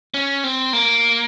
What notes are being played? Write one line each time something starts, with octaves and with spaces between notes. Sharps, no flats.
C#4
C4
A#3